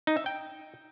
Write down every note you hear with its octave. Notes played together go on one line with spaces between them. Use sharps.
D#4
E5
G5